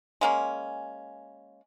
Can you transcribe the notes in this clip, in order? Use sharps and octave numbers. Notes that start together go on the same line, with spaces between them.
G#3 A#3 C#4